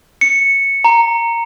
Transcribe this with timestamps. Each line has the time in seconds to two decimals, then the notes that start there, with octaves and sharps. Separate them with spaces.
0.21 C#7
0.84 A#5